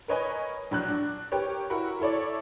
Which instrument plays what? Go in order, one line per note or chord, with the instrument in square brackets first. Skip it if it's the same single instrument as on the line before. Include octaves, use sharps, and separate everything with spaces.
[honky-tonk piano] A#4 B4 C#5 D#5 G#5 B5
A#1 F#3 F#6
D4
G4 A#4 B4 C#5
E4 F#4 A#4 B5
E4 A4 C#5 D5